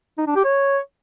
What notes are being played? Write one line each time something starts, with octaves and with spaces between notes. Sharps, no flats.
D#4
D4
G4
C#5